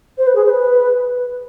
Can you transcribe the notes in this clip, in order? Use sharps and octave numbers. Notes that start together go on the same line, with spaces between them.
C5
B4
G#4
C5
B4